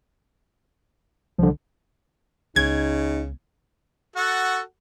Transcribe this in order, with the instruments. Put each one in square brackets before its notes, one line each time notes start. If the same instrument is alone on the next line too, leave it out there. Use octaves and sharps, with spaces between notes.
[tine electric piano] C2 D3 [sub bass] F3
[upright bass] C#2 B3 [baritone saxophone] C#3 [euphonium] D#4 [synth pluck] G#6
[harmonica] F#4 A4 F#5